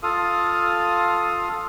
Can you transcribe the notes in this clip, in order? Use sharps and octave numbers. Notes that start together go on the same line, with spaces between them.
F4 A4 F5 D#6